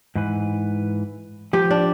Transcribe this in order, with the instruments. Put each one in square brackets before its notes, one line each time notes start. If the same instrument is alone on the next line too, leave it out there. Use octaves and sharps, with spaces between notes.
[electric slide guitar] G#2 E3 B4
[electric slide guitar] F3 [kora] G4 G5
[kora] D4